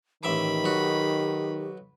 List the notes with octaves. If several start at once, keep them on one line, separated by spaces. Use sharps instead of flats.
A1 D#3 G4 E5 B5 D6
B1 F#4